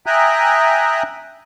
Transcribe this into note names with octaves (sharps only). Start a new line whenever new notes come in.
E5 G5 G#5 A#5 D#6 F#6